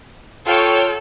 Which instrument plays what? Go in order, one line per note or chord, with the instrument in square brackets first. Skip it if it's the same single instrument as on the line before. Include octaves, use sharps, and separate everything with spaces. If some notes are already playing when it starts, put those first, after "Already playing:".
[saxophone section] F4 [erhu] A4 [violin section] C#5 G5